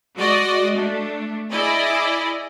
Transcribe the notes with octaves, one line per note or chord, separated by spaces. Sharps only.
G#3 F#4 D5 D#5
A3 D4
E4 G#4 D5 D#5